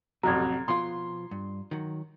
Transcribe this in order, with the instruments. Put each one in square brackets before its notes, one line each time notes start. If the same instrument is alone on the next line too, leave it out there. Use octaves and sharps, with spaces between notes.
[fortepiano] A1 F2 F#3 [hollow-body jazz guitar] C3 [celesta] A#5 G#6
[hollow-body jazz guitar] B2 F3 F4 [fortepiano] C6
[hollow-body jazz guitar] G2
D#3 F#3